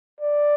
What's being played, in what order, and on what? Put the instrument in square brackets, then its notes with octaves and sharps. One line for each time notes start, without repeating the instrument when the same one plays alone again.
[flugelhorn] D5